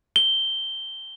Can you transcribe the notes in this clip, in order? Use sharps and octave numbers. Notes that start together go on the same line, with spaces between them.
G7